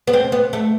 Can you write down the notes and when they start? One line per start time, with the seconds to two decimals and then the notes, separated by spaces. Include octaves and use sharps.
0.07 B3
0.13 C4
0.32 B3
0.53 A3